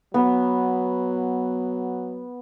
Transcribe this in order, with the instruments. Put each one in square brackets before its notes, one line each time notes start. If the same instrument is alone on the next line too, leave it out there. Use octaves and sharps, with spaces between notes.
[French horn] F#3 [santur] B3